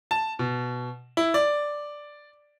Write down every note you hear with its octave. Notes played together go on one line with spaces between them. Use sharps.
A5
B2
E4
D5